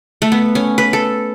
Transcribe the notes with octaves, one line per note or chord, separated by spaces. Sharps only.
A3
B3
C#4
B4
A4